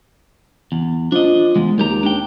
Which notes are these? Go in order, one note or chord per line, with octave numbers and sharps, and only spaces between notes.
E2
F3 D4 D#5
E2 G#3
D#2 G#3 G4 A#5
D4 G5